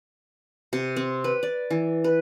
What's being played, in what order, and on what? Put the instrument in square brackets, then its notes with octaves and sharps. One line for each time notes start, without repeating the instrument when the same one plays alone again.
[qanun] C3
C4
B4
D5
E3
B4